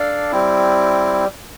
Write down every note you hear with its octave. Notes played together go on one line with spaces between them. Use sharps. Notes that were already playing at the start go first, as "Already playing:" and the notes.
Already playing: D4 A4 D5 F5
G3 C4 E4